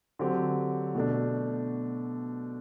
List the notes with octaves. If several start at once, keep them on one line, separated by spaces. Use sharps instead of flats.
D3 F#3 C4 G4
B2 A3 D4